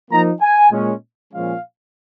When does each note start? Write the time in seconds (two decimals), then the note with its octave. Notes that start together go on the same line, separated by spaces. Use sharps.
0.11 F3 A#3 D#4 A#5
0.41 G#5
0.71 A#2 G#3 C#4
1.33 A#2 F3 G#3 C#4 F5